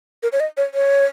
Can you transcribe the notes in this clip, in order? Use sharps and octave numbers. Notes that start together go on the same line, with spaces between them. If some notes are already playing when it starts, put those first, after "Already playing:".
A#4
C#5
D#5
C#5
C#5